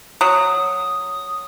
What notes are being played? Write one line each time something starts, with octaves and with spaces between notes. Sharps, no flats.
F#3 D#6